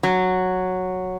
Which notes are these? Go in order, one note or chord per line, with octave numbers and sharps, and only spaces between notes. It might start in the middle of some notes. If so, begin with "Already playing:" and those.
F#3